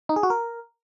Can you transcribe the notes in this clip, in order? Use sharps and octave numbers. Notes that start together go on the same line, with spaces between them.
D#4
G#4
F#4
A#4